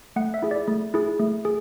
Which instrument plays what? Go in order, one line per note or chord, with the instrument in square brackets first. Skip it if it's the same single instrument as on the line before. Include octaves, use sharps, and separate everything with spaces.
[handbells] A3 F#5
E5
E4 G#4
D5
A3
E4 G#4
A3
G#4